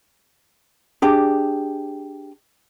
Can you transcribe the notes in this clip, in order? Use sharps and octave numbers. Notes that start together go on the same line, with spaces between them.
D4 G4 G#4